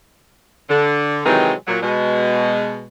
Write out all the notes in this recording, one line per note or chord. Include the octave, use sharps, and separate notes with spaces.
D3
C3 D#3 E3 F#3 G#3 C4
A#2 F#3
B2 G#3